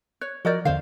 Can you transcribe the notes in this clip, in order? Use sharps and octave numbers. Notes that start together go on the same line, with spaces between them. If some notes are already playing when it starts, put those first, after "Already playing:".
C#5 F#6
F3 F#4 A#4 D5 D#5 G6
E2 D3 C5 F5